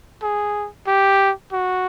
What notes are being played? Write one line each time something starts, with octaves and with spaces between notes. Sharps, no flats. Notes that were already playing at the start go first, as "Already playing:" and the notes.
G#4
G4
F#4